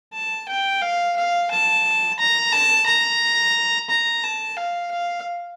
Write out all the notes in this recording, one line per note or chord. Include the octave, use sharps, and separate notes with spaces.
A5
G5
F5
F5
A5
A#5
A5
A#5
A#5
A5
F5
F5